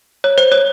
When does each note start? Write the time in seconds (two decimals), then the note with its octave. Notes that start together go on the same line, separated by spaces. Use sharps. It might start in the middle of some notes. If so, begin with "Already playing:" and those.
0.24 C#5
0.38 C5
0.52 C#5